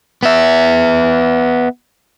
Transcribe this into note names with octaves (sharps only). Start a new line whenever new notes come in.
B3 E5